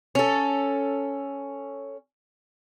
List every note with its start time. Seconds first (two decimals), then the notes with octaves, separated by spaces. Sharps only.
0.15 C#4 A4